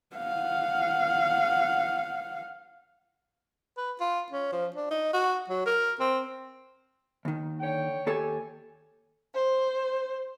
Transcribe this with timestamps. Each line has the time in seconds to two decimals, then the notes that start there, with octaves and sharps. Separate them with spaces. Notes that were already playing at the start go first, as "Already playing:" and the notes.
0.15 F5 F#5
3.77 B4
4.00 F4
4.32 C#4
4.52 F3
4.76 D4
4.91 D#4
5.13 F#4
5.49 F#3
5.66 A#4
5.99 C4
7.25 D#2 D#3
7.61 D3 C#5 G5
8.07 D#2 G4 A4 C#5 G#5
9.32 C5